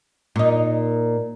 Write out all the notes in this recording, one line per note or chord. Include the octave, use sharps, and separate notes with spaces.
A#2 D#4